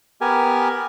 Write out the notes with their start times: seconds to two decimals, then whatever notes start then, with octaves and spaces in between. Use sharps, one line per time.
0.21 B3 G4 A#4 G#5